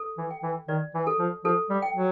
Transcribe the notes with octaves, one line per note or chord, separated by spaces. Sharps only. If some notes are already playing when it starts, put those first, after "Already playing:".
Already playing: A4
E3
G5
E3
D#3 D5
E3
A4
F3
F3 A4
G3
G5
F#3